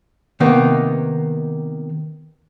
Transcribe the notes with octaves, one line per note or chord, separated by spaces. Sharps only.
C3 D#3 A#3 B3 D#4